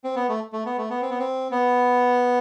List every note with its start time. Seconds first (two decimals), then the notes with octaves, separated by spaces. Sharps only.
0.04 C4
0.16 B3
0.29 A3
0.53 A3
0.66 B3
0.78 A3
0.90 B3
1.02 C4
1.10 B3
1.19 C4
1.51 B3